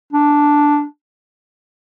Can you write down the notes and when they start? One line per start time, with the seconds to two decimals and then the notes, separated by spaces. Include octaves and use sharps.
0.13 D4